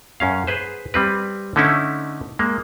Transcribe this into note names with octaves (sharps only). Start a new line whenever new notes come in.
F#2 C#4 F5
G#4 B4 C5
G3 C4 B4
D3 A3 C#4 D#4 E4
G#3 A#3